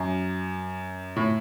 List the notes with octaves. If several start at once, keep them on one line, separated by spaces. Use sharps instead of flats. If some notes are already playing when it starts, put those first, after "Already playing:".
Already playing: F#2
A2